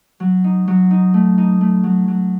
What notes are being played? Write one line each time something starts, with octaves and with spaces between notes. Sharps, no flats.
F#3
D#4
F#3
D#4
A3
D#4
A3
F#3
F#3